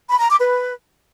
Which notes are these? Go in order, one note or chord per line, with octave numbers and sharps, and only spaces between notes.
B5
A#5
D6
B4